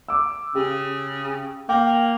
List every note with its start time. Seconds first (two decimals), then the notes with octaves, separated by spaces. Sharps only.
0.09 D6 E6
0.55 C#3 G4
1.69 A#3 G5